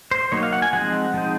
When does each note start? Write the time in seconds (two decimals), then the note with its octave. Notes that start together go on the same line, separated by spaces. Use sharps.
0.11 C5
0.32 F#3 A#3 D#4 C#5
0.43 F5
0.53 F#5
0.62 G#5
0.73 F3 G#3 C4 D#4 F#5
1.14 F3 G#3 C4 D#4